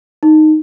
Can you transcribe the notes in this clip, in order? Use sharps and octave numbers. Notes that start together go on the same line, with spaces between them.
D#4